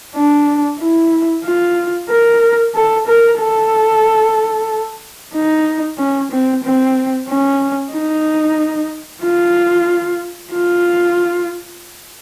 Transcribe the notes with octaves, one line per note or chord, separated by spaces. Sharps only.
D4
E4
F4
A#4
A4
A#4
A4
D#4
C#4
C4
C4
C#4
D#4
F4
F4